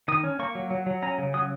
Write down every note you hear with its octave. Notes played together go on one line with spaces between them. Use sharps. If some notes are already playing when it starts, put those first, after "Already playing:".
D#3 D#6
C#4
A#3 C#6
F#3
F#3
F#3
C#4 A#5
C#3
F#3 D#6